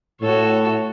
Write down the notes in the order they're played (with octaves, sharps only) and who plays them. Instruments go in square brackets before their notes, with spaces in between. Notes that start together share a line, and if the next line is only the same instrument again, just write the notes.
[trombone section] A2 [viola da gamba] F#4 A4 C#5